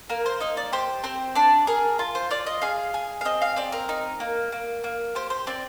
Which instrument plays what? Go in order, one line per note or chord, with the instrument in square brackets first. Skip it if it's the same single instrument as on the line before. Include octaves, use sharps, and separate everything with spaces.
[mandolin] A#3 A#4
C5
D#4 D#5
D5
G4 C5
C4 C5
D4 D5
G#4 A#4
F4
C5
F4 D5
D#5
G#4 F5
G#4
F5
C4 D#5
F5
C4 D5
A#4
D#4
A#3
A#3
A#3
G4 C5
C5
C4 D5